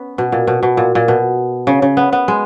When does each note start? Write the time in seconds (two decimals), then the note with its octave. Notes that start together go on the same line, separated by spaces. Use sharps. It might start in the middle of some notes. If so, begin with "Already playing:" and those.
Already playing: B3 C#4
0.18 B2
0.32 A#2
0.47 B2
0.63 B2
0.77 A#2
0.95 A#2
1.08 B2
1.67 C#3
1.82 C#3
1.97 B3
2.13 B3
2.28 G#3